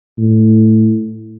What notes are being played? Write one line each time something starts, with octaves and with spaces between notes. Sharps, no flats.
A2